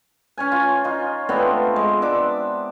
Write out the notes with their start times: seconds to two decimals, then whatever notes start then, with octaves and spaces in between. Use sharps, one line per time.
0.38 C#4 C#5 G#5
0.52 F4
0.84 D#4 F4
1.29 A3 B3 C4 D4
1.76 G#3
2.02 D4 E5 D6